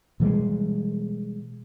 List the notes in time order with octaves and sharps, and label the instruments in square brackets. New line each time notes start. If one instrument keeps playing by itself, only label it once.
[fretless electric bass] B2 E3 G3 G#3